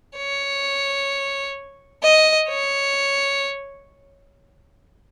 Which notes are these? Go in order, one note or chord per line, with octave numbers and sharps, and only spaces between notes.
C#5
D#5
C#5